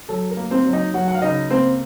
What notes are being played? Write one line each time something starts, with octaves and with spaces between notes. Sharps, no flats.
F#3 A4
A#4
A#3
C4 C5
F#3
D#4 D#5
F#3 F#4 F#5
F#5
F5
C#2 D#4 D#5
A#3 C4 C5